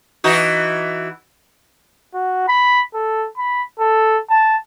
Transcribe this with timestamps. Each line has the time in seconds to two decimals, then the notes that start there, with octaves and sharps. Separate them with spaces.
0.24 E3 D#4 F#4
2.14 F#4
2.48 B5
2.94 A4
3.37 B5
3.79 A4
4.30 A5